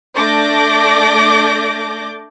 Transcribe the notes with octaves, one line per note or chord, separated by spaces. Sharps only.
A3 D4 D5 D6 G6 A#6